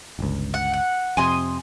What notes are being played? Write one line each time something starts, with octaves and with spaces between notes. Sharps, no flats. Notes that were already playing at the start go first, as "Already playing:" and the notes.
G1 C#2
F#5
F#5
F2 C3 G#5 C6 D#6